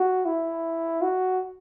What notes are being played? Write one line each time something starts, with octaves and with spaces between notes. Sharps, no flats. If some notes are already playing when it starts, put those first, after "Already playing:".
Already playing: F#4
E4
F#4